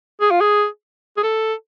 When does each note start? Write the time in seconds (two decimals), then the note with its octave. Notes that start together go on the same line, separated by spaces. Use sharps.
0.21 G#4
0.31 F4
0.41 G#4
1.17 G#4
1.23 A4